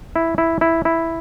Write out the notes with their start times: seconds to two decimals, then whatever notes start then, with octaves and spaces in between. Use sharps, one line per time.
0.16 E4
0.38 E4
0.61 E4
0.85 E4